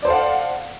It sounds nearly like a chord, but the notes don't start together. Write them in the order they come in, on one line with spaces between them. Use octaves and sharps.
D5 C5 A4 F5 F#5